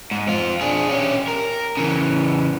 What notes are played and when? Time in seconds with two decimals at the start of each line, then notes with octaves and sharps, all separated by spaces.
0.11 G#2
0.28 C4 F4
0.61 D4 G#4
0.90 C#4 G4
1.28 A#4
1.77 C#3 E3